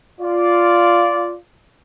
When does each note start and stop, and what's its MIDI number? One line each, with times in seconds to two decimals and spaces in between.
0.21 1.35 65
0.21 1.35 74